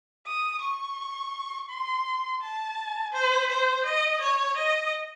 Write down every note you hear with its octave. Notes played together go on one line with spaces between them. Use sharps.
D#6
C#6
C6
A5
C5
C5
D#5
C#5
D#5